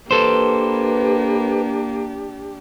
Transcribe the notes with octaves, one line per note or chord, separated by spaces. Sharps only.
A#3 D4 G4 A4 B4 C5